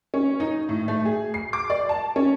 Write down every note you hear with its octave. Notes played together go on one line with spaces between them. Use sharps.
C#4
D#4
A2
A3
G#4
C7
D6
D5
A5
C#4